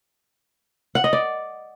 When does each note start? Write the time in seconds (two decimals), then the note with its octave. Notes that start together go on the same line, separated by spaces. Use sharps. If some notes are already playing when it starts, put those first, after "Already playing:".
0.95 F#5
1.04 D#5
1.13 D5